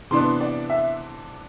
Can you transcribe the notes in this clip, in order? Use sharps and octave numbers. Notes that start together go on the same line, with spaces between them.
C3 E3 B3 D4 C6
D5
E5